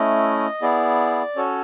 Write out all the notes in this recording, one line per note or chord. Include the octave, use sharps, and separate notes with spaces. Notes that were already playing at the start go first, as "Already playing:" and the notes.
Already playing: A3 C#4 E4 D#5
B3 E4 G#4 D5
C#4 F#4 A4 C#5